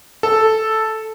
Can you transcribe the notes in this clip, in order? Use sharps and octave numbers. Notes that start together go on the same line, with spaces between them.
A4